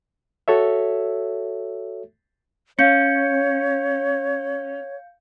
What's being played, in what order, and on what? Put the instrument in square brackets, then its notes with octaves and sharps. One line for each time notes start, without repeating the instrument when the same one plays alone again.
[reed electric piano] F#4 A4 C#5 E5
[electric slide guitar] C#4 [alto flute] C#5 [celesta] F5 G6 C#7